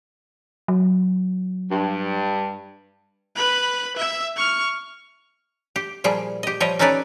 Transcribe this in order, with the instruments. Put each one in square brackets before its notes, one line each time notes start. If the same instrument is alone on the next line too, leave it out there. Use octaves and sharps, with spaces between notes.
[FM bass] F#3
[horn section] G2
[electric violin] B4 B5
E5 E6
C#6 F6
[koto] G4
A#2 F3 G3 G#4
G4 D#5
F3 G3 G4 C#5 D#5
C#4 D#4 A4 B4 C#5 D5